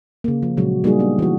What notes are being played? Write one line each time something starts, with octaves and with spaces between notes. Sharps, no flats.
C#3 A#3
F3
A#2 C#3 F3 F#3 G#3 F#4
G3 A#3 D#4 F#4 G#4
B3 D4 G4
E3 F#4